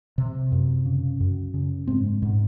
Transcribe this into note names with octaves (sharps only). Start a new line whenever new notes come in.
C3
F#2
C#3
F#2
C#3
G#2 C4
G#2